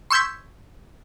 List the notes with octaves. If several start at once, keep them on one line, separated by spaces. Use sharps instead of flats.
C6 C#6 E6 G6 G#6 B6